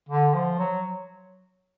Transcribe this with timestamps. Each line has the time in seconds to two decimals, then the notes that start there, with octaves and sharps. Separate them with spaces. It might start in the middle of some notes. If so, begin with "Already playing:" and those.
0.09 D3
0.34 F3
0.59 F#3